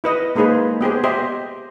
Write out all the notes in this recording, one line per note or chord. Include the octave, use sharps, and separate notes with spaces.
E4 B4 D#5
G#3 A#3 D#4 G#4 B4 C5
B3 G4 G#4 C5
G4 C5 D#5 E5